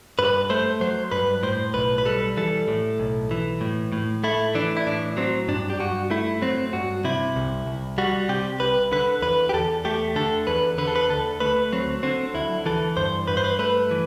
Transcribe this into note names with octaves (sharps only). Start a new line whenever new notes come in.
G2 B4
A3 C5
F#3 C5
G2 B4
A2 C5
B1 B4
B4
G3 A4
E3 A4
A2
B1
E3
A2
A2
A3 E4
E3 D4
E4
A2 D4
F#3 C4
G2 D4
G4
G2 F#4
A3 E4
F#3 C4
G2 F#4
C3 E4
C2
C2
G3 F#4
C3 G4
C2 B4
D3 B4
E2 B4
G4
E2 A4
A3 G4
D3 A4
E2 B4
D3 B4
A4
B4
D2 A4
A3 B4
F#3 C4
D3 C4
D2 E4
E3 A4
G2 C5
G2 B4
C5
B4
A3 B4
E3